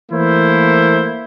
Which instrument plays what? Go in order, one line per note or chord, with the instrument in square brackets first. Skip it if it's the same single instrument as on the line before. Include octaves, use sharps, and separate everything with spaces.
[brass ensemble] E3 A3 A#3 E4 C5